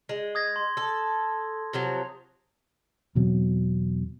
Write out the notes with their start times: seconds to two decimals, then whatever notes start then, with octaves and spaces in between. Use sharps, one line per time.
0.09 G#3
0.35 D#6 G#6 A#6
0.56 C6
0.77 A4
1.73 C3 F3 F#3
3.15 E2 B2 F#3 C4